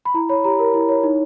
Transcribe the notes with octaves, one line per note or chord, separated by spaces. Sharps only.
B5
E4 A#5
C#5 B5
G4 A#5
A#4
E4
C#5
D#4